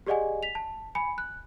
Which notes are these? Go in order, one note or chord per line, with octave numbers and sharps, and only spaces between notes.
G4 G#4 D5 D#5 F#5 G#5
B6 F7
A5
G#5 B5 C#7
F#6